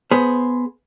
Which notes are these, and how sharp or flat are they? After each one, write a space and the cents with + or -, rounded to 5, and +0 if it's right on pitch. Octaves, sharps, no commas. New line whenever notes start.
B3 +5 G#4 +10 C5 +0